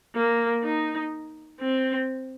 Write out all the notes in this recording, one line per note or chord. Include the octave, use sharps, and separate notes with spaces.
A#3
D#4
C4